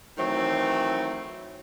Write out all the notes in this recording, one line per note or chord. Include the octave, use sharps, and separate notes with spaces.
D#3 E3 F#3 A3 C4